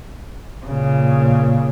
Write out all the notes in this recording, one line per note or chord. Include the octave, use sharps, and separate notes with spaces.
A#2 C#3